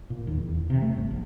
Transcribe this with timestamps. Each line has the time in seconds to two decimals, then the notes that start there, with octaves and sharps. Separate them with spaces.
0.10 A#2
0.27 D#2
0.41 E2
0.70 C3
0.82 A3
0.96 G1
1.10 A#1